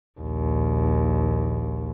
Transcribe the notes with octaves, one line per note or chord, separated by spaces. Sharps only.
A#1 D#2